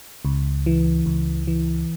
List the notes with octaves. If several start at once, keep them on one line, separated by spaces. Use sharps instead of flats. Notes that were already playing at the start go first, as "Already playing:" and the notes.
C#2
E3
C#2
E3